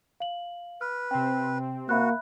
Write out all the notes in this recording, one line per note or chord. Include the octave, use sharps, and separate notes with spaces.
F5 F#7
B4 F6
C3 C4 G5
A#3 F#4 E5 B5 F#6